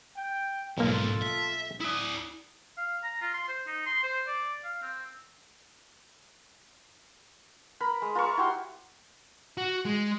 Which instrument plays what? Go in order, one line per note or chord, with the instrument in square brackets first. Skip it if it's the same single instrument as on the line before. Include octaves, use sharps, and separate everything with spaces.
[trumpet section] G5
[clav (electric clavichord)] B1 A#3 [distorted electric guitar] G#2 F3 [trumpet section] F4 A4
[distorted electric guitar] E5
[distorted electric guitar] E4 D5 [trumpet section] D#6
[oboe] F5
A#5
F4
C6
C5
D#4
C6
C5
D5
F5
C4
[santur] A#4 B5
G#3
F4 A#4 E5 C#6
E4 F#4 G4 C6
[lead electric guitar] F#4
G#3